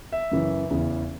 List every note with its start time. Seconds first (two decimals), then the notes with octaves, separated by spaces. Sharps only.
0.12 E5
0.31 F#2 C#3 E3
0.71 E2 C#3 E3